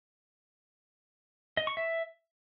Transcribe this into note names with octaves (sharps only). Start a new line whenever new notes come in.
D#5
C#6
E5